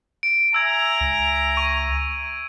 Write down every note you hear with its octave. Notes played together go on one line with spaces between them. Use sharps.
D7
E5 G#5 A#5 E6 G#6
C#2
C#6